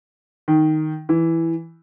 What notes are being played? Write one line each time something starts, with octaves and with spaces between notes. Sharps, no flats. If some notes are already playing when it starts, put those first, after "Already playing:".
D#3
E3